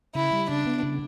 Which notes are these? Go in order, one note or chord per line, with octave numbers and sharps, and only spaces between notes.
C#3 E4
G3
C#3 D4
B3
C#3